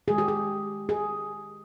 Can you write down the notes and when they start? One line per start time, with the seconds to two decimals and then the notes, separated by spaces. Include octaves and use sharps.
0.08 D#3 G#3 G#4
0.18 G4
0.28 G#4
0.89 G#4